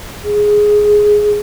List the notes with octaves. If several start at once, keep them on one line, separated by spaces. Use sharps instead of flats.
G#4